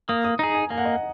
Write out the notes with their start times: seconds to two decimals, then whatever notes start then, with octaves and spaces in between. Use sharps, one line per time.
0.09 A#3 D#6
0.24 D#6
0.39 D#4 A#5
0.43 G#4
0.55 G#5
0.70 A#3 G#5
0.78 F#5
0.85 D#5
0.92 F#5